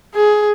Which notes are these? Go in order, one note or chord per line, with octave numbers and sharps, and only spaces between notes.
G#4